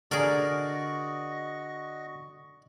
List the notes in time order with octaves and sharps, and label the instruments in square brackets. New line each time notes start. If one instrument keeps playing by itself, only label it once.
[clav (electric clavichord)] D3 [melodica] F#4 D#5 C#6 [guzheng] G#4 A#4 [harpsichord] D5